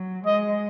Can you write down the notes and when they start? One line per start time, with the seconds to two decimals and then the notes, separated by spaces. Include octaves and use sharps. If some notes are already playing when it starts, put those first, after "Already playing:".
Already playing: F#3
0.25 G#3 D#5